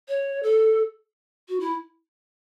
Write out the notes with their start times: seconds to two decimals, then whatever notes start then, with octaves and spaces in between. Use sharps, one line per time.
0.08 C#5
0.43 A4
1.49 F#4
1.60 E4